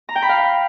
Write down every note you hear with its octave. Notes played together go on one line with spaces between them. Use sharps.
A#5
G5
B5
F5